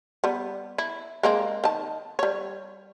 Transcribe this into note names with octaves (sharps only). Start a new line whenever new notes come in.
G3 B3
E4
G#3 A#3 C4
D#3 A5
G3 C#5